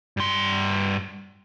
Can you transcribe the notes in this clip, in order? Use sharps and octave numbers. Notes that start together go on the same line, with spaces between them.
G2 C6